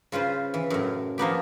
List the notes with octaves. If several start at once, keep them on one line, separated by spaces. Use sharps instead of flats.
C#3 F4 B4 C5
E3
F#2 A2
F3 A#3 B3 G4